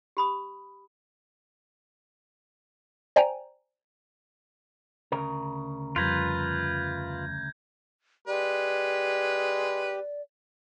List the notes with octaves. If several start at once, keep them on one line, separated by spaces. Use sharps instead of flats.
G4 B5 D#6
C5 D5 G5 G#5 A#5
D2 C#3 A#4
F2 F3 G3 F4 B4 G6 G#6 A#6
G#3 G4 B4 D5